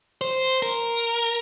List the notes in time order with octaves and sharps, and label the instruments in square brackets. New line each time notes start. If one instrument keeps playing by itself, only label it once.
[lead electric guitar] C5
A#4